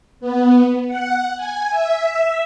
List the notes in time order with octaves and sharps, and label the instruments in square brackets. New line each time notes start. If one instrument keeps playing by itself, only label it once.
[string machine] B3
F#5
G#5
E5